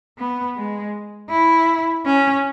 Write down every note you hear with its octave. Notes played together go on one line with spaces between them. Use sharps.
B3
G#3
E4
C#4